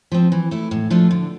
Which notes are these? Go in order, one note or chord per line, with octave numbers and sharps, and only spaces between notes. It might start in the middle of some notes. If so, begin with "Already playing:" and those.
F3 C4
E3
A3 E4
A2
F3 A3 D4
D3